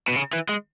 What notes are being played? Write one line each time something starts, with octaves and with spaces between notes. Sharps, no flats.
B2
C#3
E3
G#3